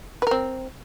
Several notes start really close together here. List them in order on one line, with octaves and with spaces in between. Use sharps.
B4 A#4 C4